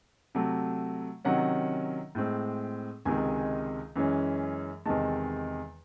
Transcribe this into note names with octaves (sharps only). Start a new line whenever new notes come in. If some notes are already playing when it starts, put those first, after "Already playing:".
C3 F#3 A3
C3 D#3 F#3 C#4 F#5
A2 G#3 C4
C#2 C3 D#3 G#3 G#5
F#2 E3 G#3 C#4
E2 C3 D#3 G#3 A5